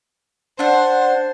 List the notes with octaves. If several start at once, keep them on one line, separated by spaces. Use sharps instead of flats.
D4 C5 F#5